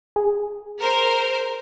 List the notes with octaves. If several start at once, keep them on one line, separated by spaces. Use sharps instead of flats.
G#4
A#4 C5